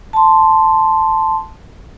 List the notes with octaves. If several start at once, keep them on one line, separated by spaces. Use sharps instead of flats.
A5 C6